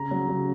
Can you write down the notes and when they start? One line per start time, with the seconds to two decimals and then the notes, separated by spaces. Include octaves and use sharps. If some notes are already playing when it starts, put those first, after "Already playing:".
Already playing: C#3 A#5
0.11 F#3
0.28 C#3